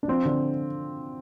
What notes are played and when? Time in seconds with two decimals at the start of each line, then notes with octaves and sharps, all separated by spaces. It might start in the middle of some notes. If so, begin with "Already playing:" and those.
0.03 D4
0.08 F3 C4
0.25 D3